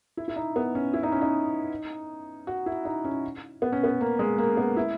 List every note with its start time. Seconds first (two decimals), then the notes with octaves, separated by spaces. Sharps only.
0.17 E4
0.28 E4
0.36 D#4
0.56 B3
0.75 C#4
0.94 E4
1.03 D#4
1.12 C#4
1.21 D#4
2.47 F#4
2.66 E4
2.85 D#4
3.04 C#4
3.62 B3
3.72 C#4
3.84 B3
4.01 A#3
4.19 G#3
4.38 A#3
4.57 B3
4.77 E4